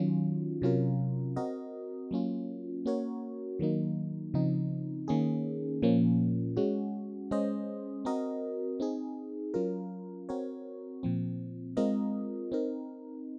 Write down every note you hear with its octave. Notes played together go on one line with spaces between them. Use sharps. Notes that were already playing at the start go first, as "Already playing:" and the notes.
Already playing: D#3 F#3 C#4 F4
C3 F#3 C#4 F4 A#4
C4 F#4 A#4 D#5
F#3 A#3 C#4 F4
A#3 C#4 F#4 A#4 C#5
D#3 F#3 A#3 D#4
C#3 F3 C4 D#4
D#3 A#3 C#4 G#4
A#2 F3 A#3 C#4
G#3 C#4 F#4
G#3 C#4 G#4 C5 D#5
C4 F#4 A#4 D#5
C4 D#4 G#4
F#3 C#4 F4 A#4
C4 F#4 A#4 C#5
A#2 F3 C4
G#3 C4 F4 A#4 D#5
C4 D#4 A#4